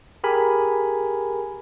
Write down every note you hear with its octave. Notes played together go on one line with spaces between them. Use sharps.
G4 G#4 A#4 G#5 B5